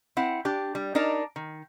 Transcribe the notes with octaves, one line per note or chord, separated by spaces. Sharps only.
C4 E4 F#5
D4 G4
G3
D4 D#4 A#4 D5
D#3